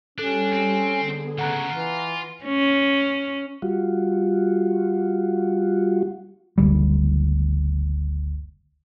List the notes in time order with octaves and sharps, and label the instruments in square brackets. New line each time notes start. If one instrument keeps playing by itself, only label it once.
[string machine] G3 G4 [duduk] C#4 [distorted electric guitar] D4 [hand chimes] A4 F#6
[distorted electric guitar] C4
[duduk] D3 [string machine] B3 G#4
[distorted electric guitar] D2 C#3 [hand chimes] F#5 A#5 F#6
[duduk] E3 [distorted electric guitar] F4 [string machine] A#6
[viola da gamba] C#4
[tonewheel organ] G3 F4 F#4
[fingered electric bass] F#1 D2 G3